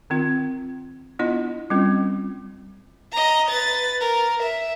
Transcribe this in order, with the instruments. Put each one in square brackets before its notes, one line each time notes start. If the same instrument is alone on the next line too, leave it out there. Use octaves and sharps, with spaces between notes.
[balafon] D#3 C4 F4
B3 D4 E4 F4 D#5
G3 C4 C#4 F4
[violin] D#5 A#5
B4 A6
A#4
E5